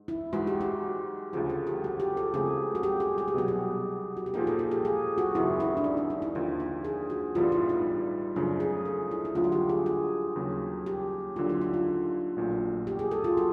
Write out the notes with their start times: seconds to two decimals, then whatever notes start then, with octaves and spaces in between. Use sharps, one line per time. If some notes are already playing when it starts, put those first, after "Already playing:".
Already playing: G#2
0.08 E4
0.33 G#2 E3 G#3 F#4
0.47 G4
0.61 F#4
1.33 D2 C#3 F3 G#4
1.50 A4
1.67 G4
1.84 F#4
2.00 G4
2.17 A4
2.33 C#2 C#3 F3 A3 C4 G#4
2.75 F#4
2.83 G4
3.00 G#4
3.18 G#4
3.28 G4
3.34 C2 B2 F#3 B3 F#4
3.48 G4
4.17 F#4
4.26 G4
4.34 A#2 F3 A#3 D#4 G#4
4.47 A4
4.59 G#4
4.71 G4
4.85 G#4
5.18 F#4
5.35 G#1 F#2 C#3 E4
5.60 E4
5.77 D4
5.84 D#4
5.97 D4
6.10 D#4
6.22 E4
6.35 D#2 D3 F3 D#4
6.60 E4
6.85 G#4
7.10 F#4
7.35 A1 G2 E3 G3 B3 F4
7.52 E4
7.69 D#4
8.36 F#2 C#3 F3 A3 D4
8.60 G#4
8.85 A4
9.11 E4
9.25 E4
9.35 D2 D3 F#3 B3 F4
9.44 F#4
9.52 G4
9.69 G#4
9.86 G#4
10.36 D#2 C#3 F#3
10.86 G4
11.36 D#2 D3 F#3 F4
11.50 E4
11.61 D#4
11.74 F4
12.36 A#1 A#2 F#3 A3
12.87 G4
12.99 G#4
13.11 A4
13.24 F4
13.37 F#4